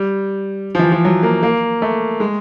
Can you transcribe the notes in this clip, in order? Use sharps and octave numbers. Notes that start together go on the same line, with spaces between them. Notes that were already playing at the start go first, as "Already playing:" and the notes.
Already playing: G3
F3
E3
F3
F#3
A#3
A#3
A3
G#3